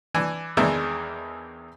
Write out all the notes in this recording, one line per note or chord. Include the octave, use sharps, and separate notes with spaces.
E3 D4 G#5
E2 D#3 E3 G#3 D4 E5